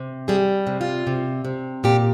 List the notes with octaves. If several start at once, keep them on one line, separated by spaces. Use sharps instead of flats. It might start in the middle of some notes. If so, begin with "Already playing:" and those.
Already playing: C3
G3 G#4
C3
F4
C3
C3
A#2 G4